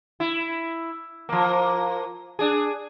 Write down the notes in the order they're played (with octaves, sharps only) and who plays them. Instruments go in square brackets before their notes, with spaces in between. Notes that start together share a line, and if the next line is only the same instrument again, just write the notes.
[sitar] E4
F3 A#3
D4 G#4